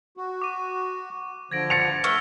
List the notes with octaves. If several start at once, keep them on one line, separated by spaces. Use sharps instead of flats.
F#4
D6 D#7
D3 F3 G#6 A#6 D7
A6 C#7 F7
A3 B4 F6 G7